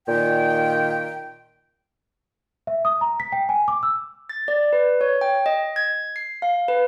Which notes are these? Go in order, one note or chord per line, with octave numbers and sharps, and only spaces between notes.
A#2 D#3 G5
E5
D#6
A#5
B6
G5
G#5
D6
E6
A6
D5
B4
C#5
G5
D#5
G#6
C7
F5
B4